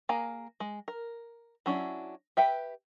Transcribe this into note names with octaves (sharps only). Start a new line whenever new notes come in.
A#3 G#4 G#5 A#5
G#3
A#4
F#3 C#4 D4 E4
G4 B4 E5 G5